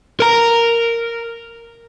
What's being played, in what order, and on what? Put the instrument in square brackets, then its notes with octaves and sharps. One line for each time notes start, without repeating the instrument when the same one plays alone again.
[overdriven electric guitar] A#4 A#5